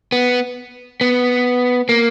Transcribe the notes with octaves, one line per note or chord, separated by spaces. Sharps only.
B3
B3
A#3